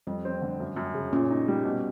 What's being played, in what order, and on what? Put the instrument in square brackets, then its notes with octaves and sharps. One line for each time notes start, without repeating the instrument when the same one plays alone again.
[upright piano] F2 [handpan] G3
[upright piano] C4
D3
F#2
F#2
C#3
[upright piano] A#2 [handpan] C#4
[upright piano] D#4
G3
B2